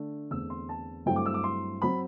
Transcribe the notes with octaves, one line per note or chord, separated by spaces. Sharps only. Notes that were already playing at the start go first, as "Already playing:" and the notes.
Already playing: D3 A3 D4
E2 D3 A3 C4 E6
C6
A5
G2 F#3 A3 C4 E4 G5
D6
E6
D6
C6
F#3 C4 B5